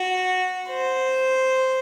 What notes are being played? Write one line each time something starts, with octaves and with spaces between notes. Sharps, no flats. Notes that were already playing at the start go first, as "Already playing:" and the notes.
Already playing: F#4
C5